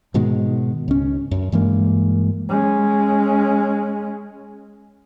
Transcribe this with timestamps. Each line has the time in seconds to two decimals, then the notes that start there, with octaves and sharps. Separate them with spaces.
0.14 G#2 B2 D#3 G#3
0.88 C#2 C#4
1.31 F#2
1.52 G2 E3 G#3 A#3
2.49 G#3 C#4